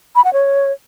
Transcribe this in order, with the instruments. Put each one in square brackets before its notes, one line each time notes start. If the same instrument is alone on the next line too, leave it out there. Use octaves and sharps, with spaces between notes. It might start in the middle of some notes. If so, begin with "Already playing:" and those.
[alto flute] B5
F#5
C#5